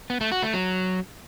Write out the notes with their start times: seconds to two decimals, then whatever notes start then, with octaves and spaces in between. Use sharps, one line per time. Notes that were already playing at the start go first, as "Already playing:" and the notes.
0.10 B3
0.21 A3
0.32 F#4
0.43 A3
0.53 F#3